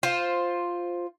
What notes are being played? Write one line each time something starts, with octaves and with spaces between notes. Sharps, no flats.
F4 C5